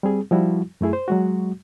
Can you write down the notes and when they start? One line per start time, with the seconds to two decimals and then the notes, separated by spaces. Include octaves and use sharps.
0.03 G3 C4 G#4
0.31 F3 G3 E4 F#4
0.81 F#2 A3 E4 G#4
0.93 C5
1.08 F#3 G#3 F#4